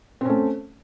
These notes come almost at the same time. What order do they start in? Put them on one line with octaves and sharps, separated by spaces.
C4 C#4 A3